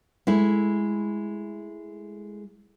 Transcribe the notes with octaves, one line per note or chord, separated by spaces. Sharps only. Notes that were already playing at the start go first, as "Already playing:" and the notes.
G#3 A3 E4